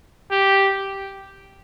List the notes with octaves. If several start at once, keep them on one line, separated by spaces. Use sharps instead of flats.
G4